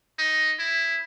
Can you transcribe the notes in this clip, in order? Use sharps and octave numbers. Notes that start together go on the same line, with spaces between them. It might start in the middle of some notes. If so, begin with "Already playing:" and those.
D#4
E4